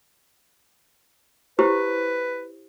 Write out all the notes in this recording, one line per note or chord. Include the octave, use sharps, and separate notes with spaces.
E4 G4 B4 C5